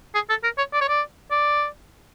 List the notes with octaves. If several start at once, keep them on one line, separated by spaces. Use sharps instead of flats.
G#4
A4
A#4
C#5
D5
C#5
D5
D5